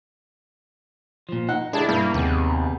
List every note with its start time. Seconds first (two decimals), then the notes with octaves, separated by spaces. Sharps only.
1.29 A#2 F3
1.49 D#4 F#5
1.73 G#3 D4 E4 A4 A5
1.89 G2 A#3
2.14 D#2 C3 B3 G#4